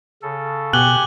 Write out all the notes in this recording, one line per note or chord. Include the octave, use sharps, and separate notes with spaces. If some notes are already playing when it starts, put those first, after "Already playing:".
C#3 A4
B2 G4 F#5 G#5 F#6 F#7 G7